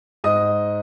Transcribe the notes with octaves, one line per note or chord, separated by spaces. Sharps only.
G#2 D#5 D#6